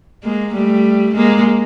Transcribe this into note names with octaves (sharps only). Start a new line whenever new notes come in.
G#3 A#3
G3 A3
G#3 A#3